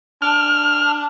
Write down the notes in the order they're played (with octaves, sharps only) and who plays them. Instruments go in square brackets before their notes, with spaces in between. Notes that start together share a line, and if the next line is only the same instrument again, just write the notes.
[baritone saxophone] D4 [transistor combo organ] F6